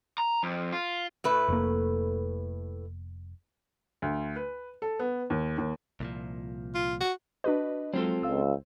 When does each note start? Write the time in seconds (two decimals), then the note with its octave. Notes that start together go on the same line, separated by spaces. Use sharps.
0.18 A#5
0.43 F2
0.73 F4
1.24 A2 A3 B4
1.48 F1 A#3
4.02 D2
4.36 B4
4.82 A4
4.99 B3
5.30 D#2
5.58 D#2
6.00 C2 A#2 F3
6.75 F4
7.01 F#4
7.44 D4 F#4 B4 D#5
7.94 F#3 G#3 C4 F4 A4 C5
8.23 C#2 F5 E6